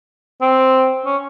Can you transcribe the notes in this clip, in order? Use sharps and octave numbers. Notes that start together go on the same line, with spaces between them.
C4
C#4